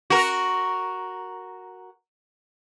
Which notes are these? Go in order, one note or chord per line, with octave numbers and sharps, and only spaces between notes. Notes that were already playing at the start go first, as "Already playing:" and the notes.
F#4 A#4